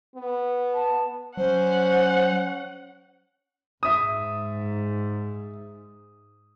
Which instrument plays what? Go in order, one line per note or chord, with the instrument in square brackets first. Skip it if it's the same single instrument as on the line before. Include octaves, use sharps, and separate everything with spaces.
[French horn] B3
[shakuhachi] A5
[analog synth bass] F#3 [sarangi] C#4 [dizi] C5 [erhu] F#5
[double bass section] G#2 [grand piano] E5 D#6